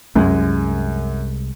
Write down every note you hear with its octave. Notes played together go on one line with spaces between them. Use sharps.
C2 F#2 G#3